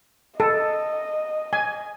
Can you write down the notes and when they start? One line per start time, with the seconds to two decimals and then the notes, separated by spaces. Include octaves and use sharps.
0.40 A4 D#5
1.53 G#5